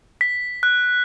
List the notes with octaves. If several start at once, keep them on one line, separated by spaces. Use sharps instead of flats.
B6
F#6